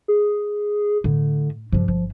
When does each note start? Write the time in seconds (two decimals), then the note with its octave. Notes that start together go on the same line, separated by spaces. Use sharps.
0.08 G#4
1.04 A2 D3
1.72 G2 C3 F3
1.88 G1 F3